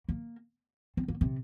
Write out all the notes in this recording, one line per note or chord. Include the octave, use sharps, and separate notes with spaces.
A#3
C4
A#3
C3